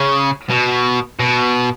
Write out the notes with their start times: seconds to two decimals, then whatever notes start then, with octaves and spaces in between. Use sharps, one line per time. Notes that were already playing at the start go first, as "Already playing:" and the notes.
Already playing: C#3
0.50 B2
1.20 B2